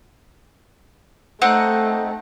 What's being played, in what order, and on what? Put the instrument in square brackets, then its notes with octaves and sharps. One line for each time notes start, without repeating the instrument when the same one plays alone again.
[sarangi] A3 [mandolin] C4 D#4 F#5